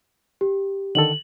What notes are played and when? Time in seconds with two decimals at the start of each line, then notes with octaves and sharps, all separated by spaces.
0.41 G4
0.95 D3 D#3 A4 F#7